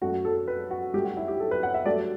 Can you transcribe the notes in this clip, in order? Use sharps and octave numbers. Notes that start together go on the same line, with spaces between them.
F#2 F#3 A3 F#4
A4
B4
F#4
G2 F#3 A3 G4
F#4
E4
G4
A4
B4
F#5
E5
G2 F#3 A3 D5